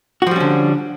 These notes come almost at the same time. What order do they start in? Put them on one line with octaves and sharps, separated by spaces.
F#4 F3 G3 C#4 D3